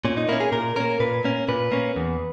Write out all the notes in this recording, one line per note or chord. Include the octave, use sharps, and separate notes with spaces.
A#2 C#4
D#4
A#3 C#4 E4
G#4
A#2 A#4
A#3 C#4 A#4
A#2 B4
A#3 C#4
A#2 B4
A#3 C#4
E2